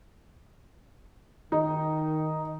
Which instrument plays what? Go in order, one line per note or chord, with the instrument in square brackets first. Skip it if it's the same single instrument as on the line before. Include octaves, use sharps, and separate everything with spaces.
[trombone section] D#3 [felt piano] D#4